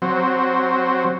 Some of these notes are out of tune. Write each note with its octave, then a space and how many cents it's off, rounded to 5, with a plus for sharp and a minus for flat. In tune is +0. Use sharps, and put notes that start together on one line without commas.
F#3 +0 C4 +0